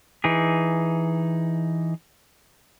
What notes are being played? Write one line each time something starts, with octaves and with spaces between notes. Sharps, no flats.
E3 D#4 G#4